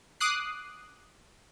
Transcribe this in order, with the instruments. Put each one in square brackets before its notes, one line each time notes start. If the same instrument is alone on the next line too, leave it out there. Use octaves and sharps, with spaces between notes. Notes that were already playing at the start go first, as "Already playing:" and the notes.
[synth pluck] D6 D#6 F#6 C7